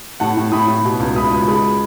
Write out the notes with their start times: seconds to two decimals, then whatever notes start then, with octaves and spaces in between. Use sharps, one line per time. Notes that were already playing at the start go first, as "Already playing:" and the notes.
0.20 A2 F#5 A5
0.37 A2
0.52 A2 B5 D#6
0.68 A2
0.85 B2
1.00 C#2
1.16 C#2 B5 D#6
1.31 C#2
1.48 G#3 B5 D#6